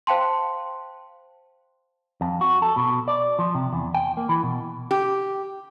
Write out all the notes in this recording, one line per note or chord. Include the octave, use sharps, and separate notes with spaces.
C5 F5 G5 A5 C6
F2
F#4
A4
B2
D5
F3
C3
E2
G5
A#3
E3
B2
G4